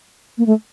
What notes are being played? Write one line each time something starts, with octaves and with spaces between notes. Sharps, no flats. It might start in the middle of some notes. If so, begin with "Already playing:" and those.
A#3
A3